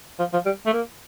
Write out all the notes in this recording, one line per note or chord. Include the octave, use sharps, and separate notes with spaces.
F3
F3
G3
A3
A#3